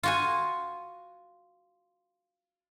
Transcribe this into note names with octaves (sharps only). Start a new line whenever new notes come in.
F4 F#4 G#5